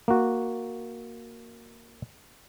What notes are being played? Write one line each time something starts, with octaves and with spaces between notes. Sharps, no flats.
A#3 F#4